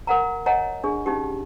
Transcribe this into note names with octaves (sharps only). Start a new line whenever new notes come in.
A#4 F#5 A#5
C#5 D#5 F#5 G#5 A#5
D4 G#4
C#4 D#4 G4